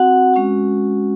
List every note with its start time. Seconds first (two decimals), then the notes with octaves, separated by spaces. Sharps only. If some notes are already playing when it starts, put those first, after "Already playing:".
Already playing: C4 F#4 F#5
0.34 G#3 C#4 F#4